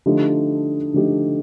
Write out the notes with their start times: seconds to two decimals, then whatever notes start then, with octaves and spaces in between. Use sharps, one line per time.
0.06 D3 F3 A3 D#4 G4
0.93 D3 F3 A3 D#4 G4